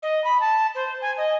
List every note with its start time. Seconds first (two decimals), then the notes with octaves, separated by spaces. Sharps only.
0.03 D#5
0.24 B5
0.41 A5
0.75 C5
1.02 G#5
1.18 D#5